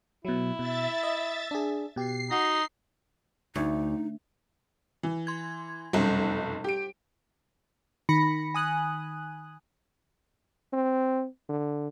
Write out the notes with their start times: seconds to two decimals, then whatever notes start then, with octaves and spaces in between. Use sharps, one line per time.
0.25 B2 F#3 E4
0.59 B2 E5 A6
1.03 D#5
1.51 D4 G#4
1.96 B2 G4 C7
2.31 D#4 F#4 A#6
3.56 D2 D#4
5.03 E3
5.27 C6 G#6
5.93 F1 B1 F#2 G3
6.64 G4 D7
8.09 D#3 B5 A#6 C#7
8.54 G#5 D#6 F#6
10.73 C4
11.49 D3